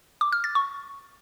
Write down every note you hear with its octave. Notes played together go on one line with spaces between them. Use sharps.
D6
F6
A6
C#6